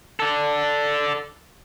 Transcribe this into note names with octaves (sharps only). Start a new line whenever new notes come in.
A4 D5